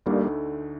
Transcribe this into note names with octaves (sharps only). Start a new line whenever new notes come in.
D2 D3 G3 A3 A#3 D#4